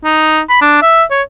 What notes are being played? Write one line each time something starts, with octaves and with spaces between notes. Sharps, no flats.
D#4
B5
D4
E5
C#5